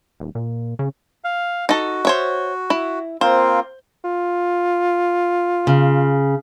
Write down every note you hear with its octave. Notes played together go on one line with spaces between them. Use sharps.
D#1
A#2
C#3
F5
D#4 F#4 A4
C5 C#5 E5
E4
A#3 C4 F4 C5
F4
C#3